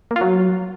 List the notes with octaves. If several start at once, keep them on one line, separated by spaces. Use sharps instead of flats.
A#3
F4
F#3